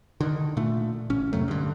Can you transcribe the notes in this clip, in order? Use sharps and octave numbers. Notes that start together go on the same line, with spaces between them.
D3 D#3
A#2 D3 A3
A1 C#4
F2 C3 F#3 A3
G2 D3